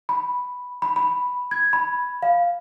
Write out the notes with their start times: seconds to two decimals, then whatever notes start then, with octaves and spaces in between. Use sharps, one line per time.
0.09 B5
0.82 B5
0.96 B5
1.51 G#6
1.73 B5
2.23 F5